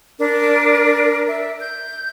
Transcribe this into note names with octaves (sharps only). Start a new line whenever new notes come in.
D4 A#4
E5
G6